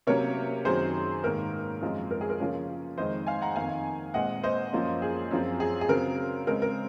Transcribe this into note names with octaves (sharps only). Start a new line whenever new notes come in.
C3 F#3 A#3 C#4 A#4 C#5
F#2 D#3 F#3 C4 G#4 C5
G#2 D#3 A#3 A#4
F#2 F3 G#3 C4
A#4
G#4
A#4
C#3 F3 A#3 C#4
F2 D#3 G#3 C4 C5 D#5
F5 G#5
F#5 A#5
F2 D#3 A#3 F5 G#5
A#2 G#3 C4 D#5 F#5
C5 D#5
F#2 F3 A#3 C#4
G#4
F#2 F3 C4
G#4
G#4
C#3 F#3 C4 A#4
C#3 G#3 C4 A#4
A#4